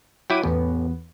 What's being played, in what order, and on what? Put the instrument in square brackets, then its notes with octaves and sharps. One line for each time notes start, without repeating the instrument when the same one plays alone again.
[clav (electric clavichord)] F#3 E4 [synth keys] G5 D6 D#7
[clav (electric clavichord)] A1 [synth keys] E2 B3